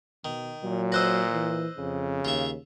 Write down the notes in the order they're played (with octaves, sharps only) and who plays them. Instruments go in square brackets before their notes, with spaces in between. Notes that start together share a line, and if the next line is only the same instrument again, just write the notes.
[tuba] B2 [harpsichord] D#3
[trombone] A#2 [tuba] F#3
[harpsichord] B4 C5 D#5 [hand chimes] E6 F#6 A#6
[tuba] E3
[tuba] F2 [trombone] C#3
[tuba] D#2 [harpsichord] F4 E5